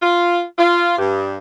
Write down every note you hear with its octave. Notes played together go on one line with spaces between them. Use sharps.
F4
F4
G2